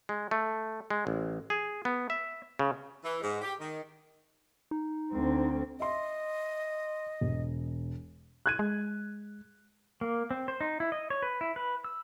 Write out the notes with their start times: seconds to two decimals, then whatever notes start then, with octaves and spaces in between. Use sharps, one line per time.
0.09 G#3
0.31 A3
0.90 G#3
1.07 A1
1.50 G#4
1.85 B3
2.10 E5
2.59 C#3
3.02 E3
3.21 G#2
3.41 G4
3.60 D#3
4.71 D#4
5.12 D2 C4
5.80 D#5 E5 C6
7.21 E1
8.46 F#6 G#6 D#7
8.59 G#3
10.01 A#3
10.31 C4
10.48 C5
10.61 D#4
10.80 E4
10.92 D#5
11.10 C#5
11.22 B4
11.41 E4
11.56 B4
11.84 E6